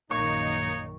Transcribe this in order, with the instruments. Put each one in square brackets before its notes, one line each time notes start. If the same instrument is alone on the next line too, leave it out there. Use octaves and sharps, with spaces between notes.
[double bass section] A#1 F#2 D#3 [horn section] A#3 D#4 [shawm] C#5 [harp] C#6